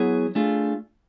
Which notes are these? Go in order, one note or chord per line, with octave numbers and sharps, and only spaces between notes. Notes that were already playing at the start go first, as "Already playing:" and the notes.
Already playing: F#3 B3 E4 G#4 C#5
A3 D4 F4 G#4